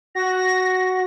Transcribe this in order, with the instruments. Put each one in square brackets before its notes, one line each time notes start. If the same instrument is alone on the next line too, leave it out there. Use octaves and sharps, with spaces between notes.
[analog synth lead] F#4 [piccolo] A#6